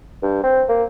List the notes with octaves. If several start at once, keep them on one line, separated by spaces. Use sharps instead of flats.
G2
C4
A#3